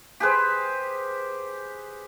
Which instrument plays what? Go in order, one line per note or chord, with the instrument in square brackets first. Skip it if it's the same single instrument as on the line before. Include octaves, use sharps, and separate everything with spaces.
[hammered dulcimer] G4 G#4 B4 C5